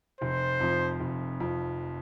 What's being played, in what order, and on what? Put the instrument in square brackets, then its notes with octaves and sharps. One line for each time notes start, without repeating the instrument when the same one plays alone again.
[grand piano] F1 [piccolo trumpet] C5
[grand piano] F2 F3
F1
F2 F3